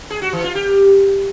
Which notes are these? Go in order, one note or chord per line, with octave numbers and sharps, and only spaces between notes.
G#4
F#4
E3
F4
G4